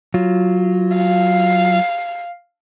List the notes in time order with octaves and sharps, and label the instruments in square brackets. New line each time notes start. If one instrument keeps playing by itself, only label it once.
[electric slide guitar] F#3 F4
[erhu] F5